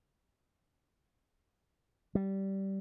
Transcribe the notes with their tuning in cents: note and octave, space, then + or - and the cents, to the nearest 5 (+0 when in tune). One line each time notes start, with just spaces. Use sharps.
G3 -15